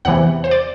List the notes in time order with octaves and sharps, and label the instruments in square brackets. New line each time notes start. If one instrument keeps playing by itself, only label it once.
[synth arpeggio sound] E2 C3 E3 F#5
C5
D5